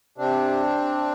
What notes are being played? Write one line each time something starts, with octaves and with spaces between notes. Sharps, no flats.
C3 C4 D4